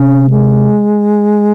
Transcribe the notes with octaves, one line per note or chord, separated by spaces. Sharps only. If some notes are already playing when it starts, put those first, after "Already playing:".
Already playing: C3 C#4
G#3